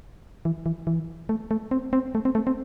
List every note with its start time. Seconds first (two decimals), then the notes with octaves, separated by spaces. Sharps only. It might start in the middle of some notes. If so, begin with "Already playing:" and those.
0.45 E3
0.66 E3
0.87 E3
1.29 A3
1.51 A3
1.71 C4
1.93 C4
2.15 A3
2.25 C4
2.35 A3
2.47 C4